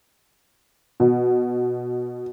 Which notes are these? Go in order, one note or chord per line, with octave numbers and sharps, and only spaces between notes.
B2